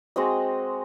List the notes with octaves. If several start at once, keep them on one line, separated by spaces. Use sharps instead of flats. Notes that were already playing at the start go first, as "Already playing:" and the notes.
G#3 C4 F#4 D#5